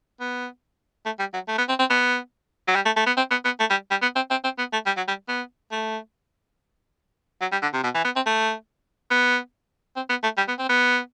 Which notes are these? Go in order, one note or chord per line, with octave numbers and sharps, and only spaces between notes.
B3
A3
G3
F#3
A3
B3
C4
C4
B3
F#3
G3
A3
A3
B3
C4
B3
B3
A3
G3
G3
B3
C4
C4
C4
B3
A3
G3
F#3
G3
B3
A3
F#3
G3
D3
C3
B2
E3
B3
C4
A3
B3
C4
B3
A3
G3
B3
C4
B3